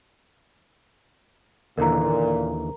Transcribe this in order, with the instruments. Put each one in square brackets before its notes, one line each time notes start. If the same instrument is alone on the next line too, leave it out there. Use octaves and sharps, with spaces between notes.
[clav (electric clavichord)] D#2 D3 E3 [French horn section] A#2 [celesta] A#4 A#5